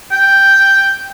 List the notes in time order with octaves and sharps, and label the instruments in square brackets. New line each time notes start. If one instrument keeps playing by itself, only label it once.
[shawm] G5